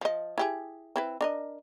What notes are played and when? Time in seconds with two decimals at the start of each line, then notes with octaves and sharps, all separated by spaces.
0.01 F3 D#5
0.38 E4 G4 G#4
0.96 C4 E4 B4
1.21 D4 A#4 D#5